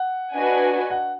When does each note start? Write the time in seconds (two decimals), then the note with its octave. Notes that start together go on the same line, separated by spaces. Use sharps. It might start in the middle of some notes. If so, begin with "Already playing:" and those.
Already playing: F#5
0.33 D4 F#4 B4 D#5 G#5
0.90 F#5